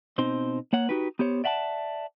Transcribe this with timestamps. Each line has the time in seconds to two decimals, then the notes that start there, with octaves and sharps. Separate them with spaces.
0.18 B2 C4 D#4 C5
0.73 A#3 C#5 F#5
0.89 D#4 F#4 G4 B4
1.19 B3 G4 C5 C#5
1.44 D5 E5 F#5 G5 A5